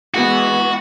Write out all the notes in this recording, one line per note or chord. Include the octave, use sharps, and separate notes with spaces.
E3 G#3 B3 F#4